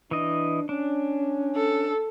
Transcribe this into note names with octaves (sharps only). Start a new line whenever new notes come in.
E3 D4 D#5
C#4 D4
A4